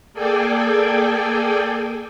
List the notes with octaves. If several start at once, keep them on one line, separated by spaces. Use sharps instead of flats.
A#3 G#4 A4 D5 G5 G#5